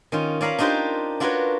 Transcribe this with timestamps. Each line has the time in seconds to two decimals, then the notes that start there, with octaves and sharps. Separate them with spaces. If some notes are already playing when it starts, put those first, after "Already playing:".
0.12 D#3 C#4 F4
0.41 C#4 D5 F5 A#5 B5
0.59 D4 D#4 F4 G4 A#4 C5
1.20 D4 F4 F#4 A#4 B4 C#5